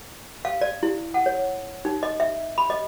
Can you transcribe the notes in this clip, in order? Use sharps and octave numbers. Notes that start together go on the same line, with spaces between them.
F5
D5
E4
F#5
C#5
D#4
D#5
E5
B5
D#5